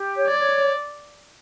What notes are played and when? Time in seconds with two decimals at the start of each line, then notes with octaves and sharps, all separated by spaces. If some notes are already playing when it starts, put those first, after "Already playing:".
Already playing: G4
0.16 C#5
0.28 D5
0.39 C#5